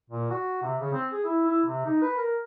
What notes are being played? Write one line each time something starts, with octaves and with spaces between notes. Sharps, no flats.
A#2
F#4
C3
C#3
C4
G#4
E4
E4
C3
D#4
B4
A#4